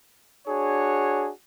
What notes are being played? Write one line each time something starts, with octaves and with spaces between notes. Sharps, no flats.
D4 F#4 G#4 C#5